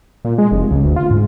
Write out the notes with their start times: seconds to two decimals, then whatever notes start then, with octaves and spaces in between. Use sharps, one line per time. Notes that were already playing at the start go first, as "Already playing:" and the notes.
0.25 A#2
0.38 G#3
0.52 F1
0.71 C#2
0.83 D2
0.96 F4
1.10 G#2